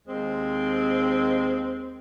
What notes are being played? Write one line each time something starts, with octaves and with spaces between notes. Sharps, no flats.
D#2 G#3 C4